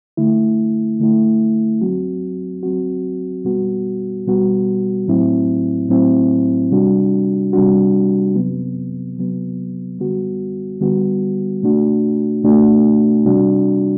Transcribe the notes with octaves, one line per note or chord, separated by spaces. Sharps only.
D3 A3 E4
D3 A3 E4
F#3 C4 F#4
F#3 C4 F#4
B2 G3 B3 F#4
B2 G3 B3 F#4
A2 F#3 C4 E4
A2 F#3 C4 E4
C3 G3 D4 F#4
C3 G3 D4 F#4
C3 F#3 B3
C3 F#3 B3
D3 G3 B3 F#4
D3 G3 B3 F#4
B2 A3 D4 F#4
B2 A3 D4 F#4
C3 G3 D4 F#4